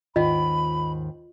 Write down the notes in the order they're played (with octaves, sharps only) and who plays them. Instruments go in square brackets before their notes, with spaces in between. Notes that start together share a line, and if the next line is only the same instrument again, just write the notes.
[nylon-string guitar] D#2 G#2 D#3 [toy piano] F4 D#5 [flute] B5